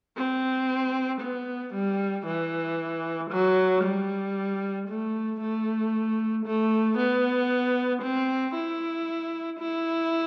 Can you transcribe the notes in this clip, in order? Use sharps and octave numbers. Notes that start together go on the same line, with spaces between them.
C4
B3
G3
E3
F#3
G3
A3
A3
A3
B3
C4
E4
E4